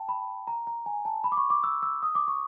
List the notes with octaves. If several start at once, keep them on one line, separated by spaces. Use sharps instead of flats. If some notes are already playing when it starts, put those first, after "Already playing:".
Already playing: G5 A5
B5
A#5
A#5
G#5
A5
B5
D6
C#6
D6
E6
E6
D#6
D6
C#6